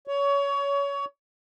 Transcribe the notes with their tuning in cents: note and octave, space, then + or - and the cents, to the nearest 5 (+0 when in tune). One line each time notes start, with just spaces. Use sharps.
C#5 +25